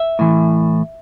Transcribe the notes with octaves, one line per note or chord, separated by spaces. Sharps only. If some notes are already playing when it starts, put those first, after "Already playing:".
Already playing: E5
A2 E3